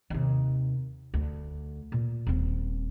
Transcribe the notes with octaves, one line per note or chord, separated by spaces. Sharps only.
D#2 C3
D2
A#2
D#1 C4